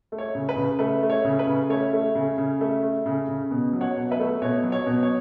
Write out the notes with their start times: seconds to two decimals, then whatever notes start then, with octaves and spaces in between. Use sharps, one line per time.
0.12 A3
0.18 C#5
0.35 C#3
0.49 B4
0.56 C#3
0.79 A3 B4
1.03 A3
1.10 C#5
1.25 C#3
1.39 B4
1.47 C#3
1.69 A3 C#5
1.93 A3
2.15 C#3
2.38 C#3
2.61 A3
2.83 A3
3.06 C#3
3.29 C#3
3.51 B2
3.73 F#3
3.81 C#5 F#5
3.97 B2
4.11 B4 E5
4.19 A3
4.42 B2 C#5
4.64 F#3
4.72 C#5
4.86 B2
5.03 C#5